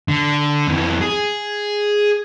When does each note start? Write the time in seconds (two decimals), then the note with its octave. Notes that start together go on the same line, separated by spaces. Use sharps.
0.08 D3
0.68 F2 E3
1.02 G#4